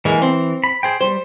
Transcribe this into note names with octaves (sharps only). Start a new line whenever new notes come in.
E3 G#3 A#3 G#4
C4
B5
G#4 C5 G5
G3 C5